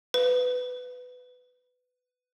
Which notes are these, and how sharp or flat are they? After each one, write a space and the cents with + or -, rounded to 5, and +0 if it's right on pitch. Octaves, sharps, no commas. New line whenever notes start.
B4 +15